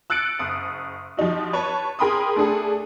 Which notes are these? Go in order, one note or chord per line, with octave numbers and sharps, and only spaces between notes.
E6 F#6 A6 C#7 D7
F#1 D#6
F3 G3 D#4 F#4
B4 C#5 A5 C#6
G#4 A#4 G5 B5 C6 D#6
A3 D4 G#4 A4